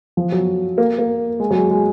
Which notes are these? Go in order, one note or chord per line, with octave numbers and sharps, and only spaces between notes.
F3
F#3
A#3
A#3
G#3
F#3
G#3
G#3